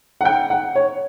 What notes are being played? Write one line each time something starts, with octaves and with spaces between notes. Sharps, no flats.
F#5
G5
F#5
C#5